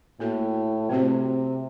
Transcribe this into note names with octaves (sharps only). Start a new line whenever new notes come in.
A2 A#3 F#4 A4
C3 A3 C4 F#4 C5